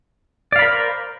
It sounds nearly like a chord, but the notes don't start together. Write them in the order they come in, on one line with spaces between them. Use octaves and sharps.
D5 F5 B5 A#4 C5